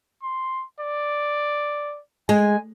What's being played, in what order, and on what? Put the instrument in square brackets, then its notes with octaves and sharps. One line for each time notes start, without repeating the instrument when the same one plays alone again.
[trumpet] C6
D5
[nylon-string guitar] G#3 [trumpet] G#5